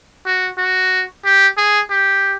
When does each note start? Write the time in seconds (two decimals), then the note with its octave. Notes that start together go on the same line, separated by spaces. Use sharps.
0.26 F#4
0.58 F#4
1.25 G4
1.57 G#4
1.90 G4